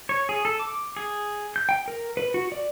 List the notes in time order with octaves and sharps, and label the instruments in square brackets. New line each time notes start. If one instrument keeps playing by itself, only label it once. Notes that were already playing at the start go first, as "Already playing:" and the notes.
[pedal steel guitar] C#5
G#4
A4
D6
G#4
G6
G5
A#4
B4
F#4
D5